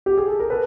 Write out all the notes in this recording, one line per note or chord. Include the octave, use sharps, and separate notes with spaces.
G4
G#4
A4
A#4
A4 B4